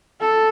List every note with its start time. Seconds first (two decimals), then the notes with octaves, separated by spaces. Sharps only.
0.20 A4